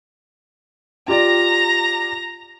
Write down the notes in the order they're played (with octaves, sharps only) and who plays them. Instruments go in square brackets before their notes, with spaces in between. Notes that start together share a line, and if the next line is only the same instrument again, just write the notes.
[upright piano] F4 G4 D5 [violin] A#5 A#6